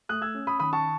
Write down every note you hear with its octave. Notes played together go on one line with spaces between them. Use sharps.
A3 D#6 F#6
E6 G#6
C#4
B5 D#6
D#3 B5 D#6
A5 C#6